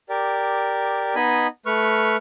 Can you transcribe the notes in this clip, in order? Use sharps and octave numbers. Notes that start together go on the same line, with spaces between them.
G4 A#4 D5
B3 D#4 D#5 G#5 B5
A3 B4 C#6 F6